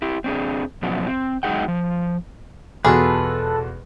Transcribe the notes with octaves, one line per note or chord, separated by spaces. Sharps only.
E4 G4
C4 D4 G#4
B2 F3 F#3 B3 C#4 D4
C4
F#3 G#3 D#4 G#4 F#5 G5
F3
E2 B2 F4 F#4 G#4 A4 B4